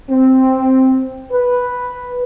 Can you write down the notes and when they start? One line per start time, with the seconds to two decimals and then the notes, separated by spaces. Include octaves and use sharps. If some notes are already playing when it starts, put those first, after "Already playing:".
0.10 C4
1.32 B4